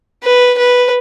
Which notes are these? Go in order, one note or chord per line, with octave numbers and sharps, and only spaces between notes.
B4
B4